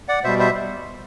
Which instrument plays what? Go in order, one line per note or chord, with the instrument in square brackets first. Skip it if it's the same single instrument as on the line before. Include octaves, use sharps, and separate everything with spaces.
[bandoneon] D5 F#5
B2 G3 C5 E5
C5 E5